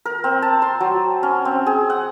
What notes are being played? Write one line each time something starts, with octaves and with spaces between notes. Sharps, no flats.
A#4
C4
A5
C6
F#3
C#4
C4
G#4
F#5